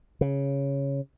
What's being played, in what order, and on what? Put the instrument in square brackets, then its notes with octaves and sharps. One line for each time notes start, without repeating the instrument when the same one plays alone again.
[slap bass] C#3